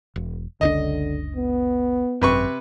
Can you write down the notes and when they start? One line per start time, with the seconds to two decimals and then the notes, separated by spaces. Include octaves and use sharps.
0.16 E1
0.61 F#1 C#2 D3 D4 D#5
1.36 B3
2.22 G#1 F#2 C3 B4 C#6